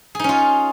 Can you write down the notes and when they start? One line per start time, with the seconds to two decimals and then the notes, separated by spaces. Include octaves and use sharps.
0.15 G#4
0.19 D#4
0.24 C#4
0.29 F4